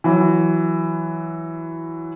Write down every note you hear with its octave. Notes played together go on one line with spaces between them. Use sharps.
E3 F#3